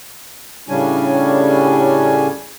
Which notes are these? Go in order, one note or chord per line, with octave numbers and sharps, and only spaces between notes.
A2 C#3 G3 C#4 D4 G#5